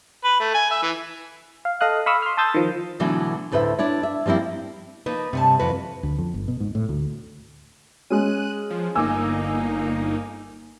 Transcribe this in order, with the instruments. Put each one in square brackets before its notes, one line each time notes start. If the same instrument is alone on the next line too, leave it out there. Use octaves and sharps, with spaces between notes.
[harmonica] B4
A3
G#5
E5
E3
[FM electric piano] F5
A4 D#5 F5 D#6 F#6
F5 B5 C#6 D#6 E6
C6 F6
A5 C6 D#6 E6 G6 A6
D#3 F3
[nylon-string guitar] B2 D3 E3 F#3 A3 F#4
D2 A2 B4 C5 E5
D4 E4 C#5
E5
F3 G3 A#3 C4 E4
[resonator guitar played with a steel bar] F3 A#3 D#4 [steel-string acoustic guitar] B4
[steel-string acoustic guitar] G2 C3 [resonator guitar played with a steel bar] A3 G#5 A5
[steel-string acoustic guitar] F2 E3 B4 [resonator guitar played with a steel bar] F#4
[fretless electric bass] D2
F2
G1
B2
G#2
A2
D2
[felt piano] G#3 C#4 [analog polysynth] F#6 D#7
[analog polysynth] F3
[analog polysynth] G1 A#3 D#4 [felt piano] G#5 D6 E6